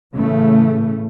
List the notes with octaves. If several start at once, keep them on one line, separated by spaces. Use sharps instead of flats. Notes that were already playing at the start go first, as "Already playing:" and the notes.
A2 C#3 E3 A3